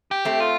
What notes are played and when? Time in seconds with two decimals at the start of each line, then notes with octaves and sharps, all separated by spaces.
0.11 G4
0.25 A3 C4
0.40 F4